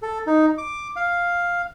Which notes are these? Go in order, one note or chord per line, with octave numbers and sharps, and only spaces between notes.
A4
D#4
D6
F5